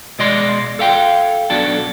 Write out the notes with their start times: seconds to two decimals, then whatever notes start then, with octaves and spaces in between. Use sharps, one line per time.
0.19 B2 G#3 D5 D#5 C6
0.79 A4 F5 G5
1.50 B1 B2 F#3 D4 A4